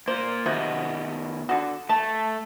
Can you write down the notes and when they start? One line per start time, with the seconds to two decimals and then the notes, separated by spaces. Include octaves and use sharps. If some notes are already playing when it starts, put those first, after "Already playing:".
0.08 A#3 F4 C5
0.46 C3 D#3 F3 B3 F#4 D#5
1.49 D3 F#4
1.89 A3 A5